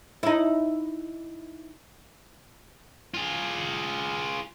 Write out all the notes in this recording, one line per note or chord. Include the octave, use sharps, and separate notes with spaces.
D#4 E4
F4 G#4